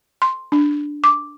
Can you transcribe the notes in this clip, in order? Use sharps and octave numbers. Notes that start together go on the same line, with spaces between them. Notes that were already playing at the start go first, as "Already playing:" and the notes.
C6
D4
D6